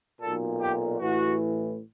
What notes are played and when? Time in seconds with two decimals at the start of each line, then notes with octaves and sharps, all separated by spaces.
0.22 B1 A#2 A4
0.61 G4
1.00 A1 A2 E3 F#4